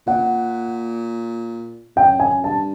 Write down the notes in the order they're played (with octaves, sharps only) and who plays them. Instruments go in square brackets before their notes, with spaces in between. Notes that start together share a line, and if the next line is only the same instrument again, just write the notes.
[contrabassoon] A#2 [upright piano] F#5
[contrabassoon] F#2 [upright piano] G5
[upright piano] G#5
[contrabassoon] G2 [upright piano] A5